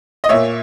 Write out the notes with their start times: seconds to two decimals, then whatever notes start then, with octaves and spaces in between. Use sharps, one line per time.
0.24 D#5
0.29 A#2 A#3 C#5 E5